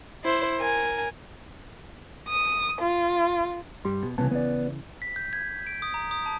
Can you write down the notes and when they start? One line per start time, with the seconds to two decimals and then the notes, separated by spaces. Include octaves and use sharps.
0.24 E4 C5
0.59 A#4 G#5
2.27 D#6
2.82 F4
3.85 G2 G3 G4 C6
4.03 B2
4.18 C2 C#3 E3 B3 A5
4.31 B3 D5
5.02 B6
5.16 G6
5.33 G#6
5.48 G#6
5.67 D7
5.82 D#6
5.94 A#5
6.11 D#6
6.26 A5